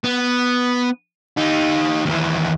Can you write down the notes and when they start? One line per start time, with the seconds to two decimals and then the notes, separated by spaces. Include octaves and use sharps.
0.04 B3
1.38 D#4 G4
2.05 D#2 E3